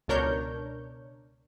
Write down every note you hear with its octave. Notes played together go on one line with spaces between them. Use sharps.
C#2 B2 D4 A#4 C#5 G6